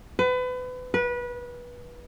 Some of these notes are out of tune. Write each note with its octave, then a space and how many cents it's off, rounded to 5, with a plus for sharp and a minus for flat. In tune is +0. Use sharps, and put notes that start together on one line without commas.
B4 +30
B4 -25